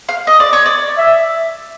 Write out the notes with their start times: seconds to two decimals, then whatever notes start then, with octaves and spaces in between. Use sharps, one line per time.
0.09 F5
0.27 D#5
0.40 D5
0.53 C#5
0.66 D5
0.97 E5